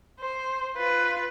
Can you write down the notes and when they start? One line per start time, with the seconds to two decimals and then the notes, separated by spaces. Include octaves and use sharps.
0.20 C5
0.77 F4 B4